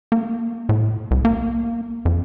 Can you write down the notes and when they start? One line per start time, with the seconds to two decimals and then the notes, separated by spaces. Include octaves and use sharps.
0.12 A#3
0.69 A2
1.11 C2
1.25 A#3
2.05 F2